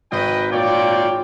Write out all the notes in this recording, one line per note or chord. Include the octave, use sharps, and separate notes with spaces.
G#1 B4 D#5 G5
A#2 F4 C#5 D5 G5